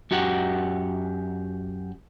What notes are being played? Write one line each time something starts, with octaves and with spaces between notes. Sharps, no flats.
F#2 F#4 G4 F#5